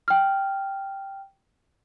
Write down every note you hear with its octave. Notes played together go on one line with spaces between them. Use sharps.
G5 F6